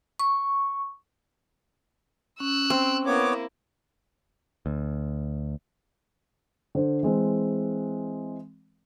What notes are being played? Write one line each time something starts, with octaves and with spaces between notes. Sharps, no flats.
C#6
C#4 E6 F#6
C4
A#3 B3 E4 C#5 D6
D2
D3 C5
E3 G#3 C4